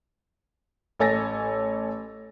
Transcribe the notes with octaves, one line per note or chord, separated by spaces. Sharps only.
A1 A4 C#5 G#5 A6 A#6